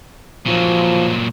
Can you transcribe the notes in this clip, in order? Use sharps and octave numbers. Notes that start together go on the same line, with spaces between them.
A#2 F3 F#3